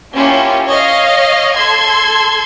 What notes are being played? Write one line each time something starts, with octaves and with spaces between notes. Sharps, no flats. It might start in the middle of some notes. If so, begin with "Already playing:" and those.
A#3 C#4 E4 F4 G4
C#5 D#5 F5
A4 C6 G#6